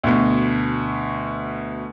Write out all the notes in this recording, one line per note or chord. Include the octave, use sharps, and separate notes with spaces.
D2 B2